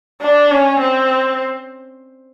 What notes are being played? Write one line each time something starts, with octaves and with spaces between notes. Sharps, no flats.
D4
C#4
C4